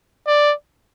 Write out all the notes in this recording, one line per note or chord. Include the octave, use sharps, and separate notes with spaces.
D5